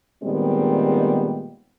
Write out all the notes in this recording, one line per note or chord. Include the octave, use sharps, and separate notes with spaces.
A#2 D#3 G3 G#3 B3 C4